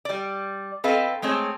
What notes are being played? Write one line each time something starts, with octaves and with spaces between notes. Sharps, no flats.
G3 D5
C4 A4 B4 D#5 F5
G#3 A3 C4 G#4 C#5